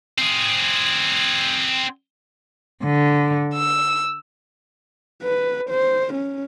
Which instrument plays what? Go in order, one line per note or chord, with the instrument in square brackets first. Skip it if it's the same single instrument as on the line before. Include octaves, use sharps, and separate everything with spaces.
[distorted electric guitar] C4 G#4
[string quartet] D3
E6
[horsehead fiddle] B4
C5
C#4